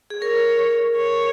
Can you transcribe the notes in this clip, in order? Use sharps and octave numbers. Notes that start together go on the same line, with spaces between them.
G#4
A#4 C#5
C#5